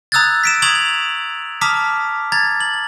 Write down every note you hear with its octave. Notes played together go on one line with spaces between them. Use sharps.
A#5 D#6 E6 F#6 G#6 A6
B6 D7 E7
A#5 C#6 D#6 G#6 F7 F#7
A5 A#5 D6 D#6 F6 B6
A#5 G#6 A6
F#7